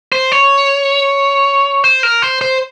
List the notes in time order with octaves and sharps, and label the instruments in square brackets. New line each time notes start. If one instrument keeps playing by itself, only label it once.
[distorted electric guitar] C5
C#5
C5
A#4
C5
C5